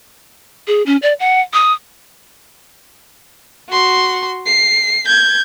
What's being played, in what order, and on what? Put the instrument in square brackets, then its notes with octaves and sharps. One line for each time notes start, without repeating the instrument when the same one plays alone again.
[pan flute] G#4
C#4
D5
F#5
D#6
[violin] F#4 C6
C7
G6 G#6